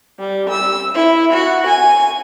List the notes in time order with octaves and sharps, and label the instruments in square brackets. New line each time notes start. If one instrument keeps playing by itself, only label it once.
[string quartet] G3
E6
E4
F#4
G#5